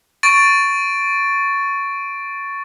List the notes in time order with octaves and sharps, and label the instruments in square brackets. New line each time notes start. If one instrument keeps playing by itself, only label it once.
[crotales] C#6 A6 D7